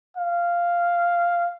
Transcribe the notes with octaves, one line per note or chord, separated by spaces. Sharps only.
F5